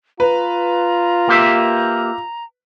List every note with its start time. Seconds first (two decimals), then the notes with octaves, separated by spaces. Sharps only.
0.20 F4 B4 A#5
1.29 A#3 G4 E5